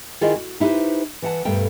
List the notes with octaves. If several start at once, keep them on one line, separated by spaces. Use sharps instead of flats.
D#3 E4 F4 G#4 D5 D#5
F#4
D#4 E4 G4 A4 B4 C5
E3 F#5 A5
D2 G2 B2 A3 A#4 G5